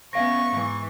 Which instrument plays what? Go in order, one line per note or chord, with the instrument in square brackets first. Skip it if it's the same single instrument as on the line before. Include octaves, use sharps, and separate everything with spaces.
[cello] B3 C#4 [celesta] E5 F5 A#6 [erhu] C#6
[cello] G#2 E3